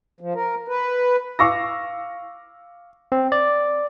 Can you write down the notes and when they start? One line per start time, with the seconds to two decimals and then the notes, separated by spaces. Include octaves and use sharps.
0.21 F3
0.35 A#4
0.68 B4
1.39 F5 C#6 D6 E6 A#6
3.12 C4
3.32 D5